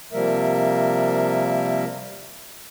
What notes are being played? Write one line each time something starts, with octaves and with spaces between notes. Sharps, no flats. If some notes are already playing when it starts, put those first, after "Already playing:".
C3 F3 G3 A#3 A#4 E5